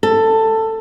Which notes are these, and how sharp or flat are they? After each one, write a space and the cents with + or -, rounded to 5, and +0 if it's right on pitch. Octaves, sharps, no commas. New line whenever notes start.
A4 +15